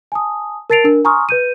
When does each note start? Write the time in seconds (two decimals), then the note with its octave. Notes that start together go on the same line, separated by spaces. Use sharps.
0.12 G#5 A5 D#6
0.70 A#4 A5 A6 C7 D7 F7
0.84 D4 A#4
1.05 G#5 A#5 C6 C#6 D#6 F6
1.29 B4 G6 D#7